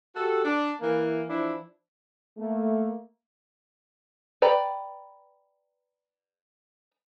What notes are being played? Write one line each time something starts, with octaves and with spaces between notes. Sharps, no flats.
F#4 G4 A4
D4
E3 A#3
E3 F3 D4 E4
A3 A#3
B4 D5 G5 A#5 B5